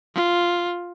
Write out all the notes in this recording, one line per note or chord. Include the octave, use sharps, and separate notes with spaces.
F4